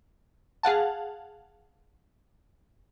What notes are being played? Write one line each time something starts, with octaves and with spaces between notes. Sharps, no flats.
G#4 F5 F#5 A5